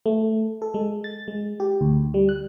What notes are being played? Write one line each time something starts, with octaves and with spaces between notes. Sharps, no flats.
A3
A4
G#3
A6
G#3
G4
D2
G3
F#6